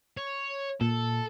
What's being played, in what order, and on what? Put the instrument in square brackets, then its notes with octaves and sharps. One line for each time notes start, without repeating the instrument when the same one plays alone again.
[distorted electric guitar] C#5
[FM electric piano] A#2 [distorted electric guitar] A4